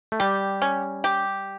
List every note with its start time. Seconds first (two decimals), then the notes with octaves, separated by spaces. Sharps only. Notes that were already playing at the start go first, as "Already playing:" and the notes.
0.12 A3
0.20 G3 G4
0.62 C#4
1.04 G4